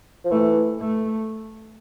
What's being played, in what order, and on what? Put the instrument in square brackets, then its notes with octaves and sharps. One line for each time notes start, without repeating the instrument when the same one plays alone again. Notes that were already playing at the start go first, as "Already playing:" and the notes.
[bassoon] F3
[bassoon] E3 [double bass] A3
[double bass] A3